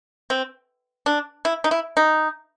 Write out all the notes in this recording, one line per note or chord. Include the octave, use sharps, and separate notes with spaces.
C4
D4
E4
D#4
E4
D#4